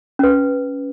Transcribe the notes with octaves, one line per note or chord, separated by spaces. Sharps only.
C#4 B4